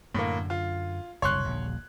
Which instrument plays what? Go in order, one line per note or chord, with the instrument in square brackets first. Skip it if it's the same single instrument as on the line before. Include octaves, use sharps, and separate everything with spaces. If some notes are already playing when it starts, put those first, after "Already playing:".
[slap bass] F#2 D3 [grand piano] A2 A#3
[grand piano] F4
[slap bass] F#1 C2 D3 [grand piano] C#5 C6 F#6
[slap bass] D#1 A#1 D3